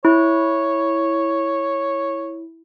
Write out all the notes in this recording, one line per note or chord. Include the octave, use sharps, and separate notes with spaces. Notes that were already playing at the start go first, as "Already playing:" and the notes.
E4 C#5